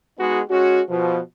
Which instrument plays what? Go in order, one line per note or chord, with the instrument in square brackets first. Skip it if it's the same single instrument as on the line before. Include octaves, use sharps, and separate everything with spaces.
[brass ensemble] G#3 B3 D#4 F#4 G#4
G#3 C#4 F#4
B2 F3